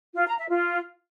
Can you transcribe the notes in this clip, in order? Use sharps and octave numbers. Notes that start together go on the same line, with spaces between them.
F4
A#5
E5
F4